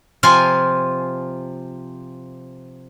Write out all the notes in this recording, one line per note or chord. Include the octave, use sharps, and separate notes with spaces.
C3 F3 F4 F5 G#5